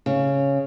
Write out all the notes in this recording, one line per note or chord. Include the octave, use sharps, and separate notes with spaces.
C#3